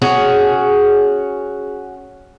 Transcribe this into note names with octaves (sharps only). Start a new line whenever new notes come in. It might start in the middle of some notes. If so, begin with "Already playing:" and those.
C#4 F#4 G#4